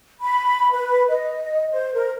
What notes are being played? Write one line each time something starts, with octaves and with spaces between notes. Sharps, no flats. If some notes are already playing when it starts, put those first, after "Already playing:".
B5
B4
D#5
C5
A#4